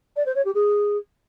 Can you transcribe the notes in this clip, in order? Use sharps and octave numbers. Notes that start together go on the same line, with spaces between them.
D5
C5
C#5
G4
G#4